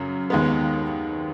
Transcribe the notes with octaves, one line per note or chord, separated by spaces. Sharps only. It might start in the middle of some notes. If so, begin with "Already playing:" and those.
Already playing: F#2 C#3 F#3
D#2 D#3 G#3 B3